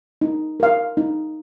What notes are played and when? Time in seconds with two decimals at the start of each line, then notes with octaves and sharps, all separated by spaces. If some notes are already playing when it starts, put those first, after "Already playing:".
0.21 D#4
0.60 A#4 F5
0.97 D#4